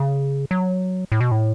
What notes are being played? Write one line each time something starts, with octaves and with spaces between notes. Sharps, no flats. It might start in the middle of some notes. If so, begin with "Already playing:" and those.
Already playing: C#3
F#3
A2
B2
A2